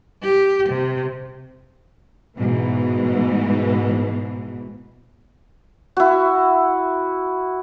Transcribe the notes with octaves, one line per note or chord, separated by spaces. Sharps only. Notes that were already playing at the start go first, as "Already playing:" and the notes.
G4
C3
G#2 B2 E3
E4 F#4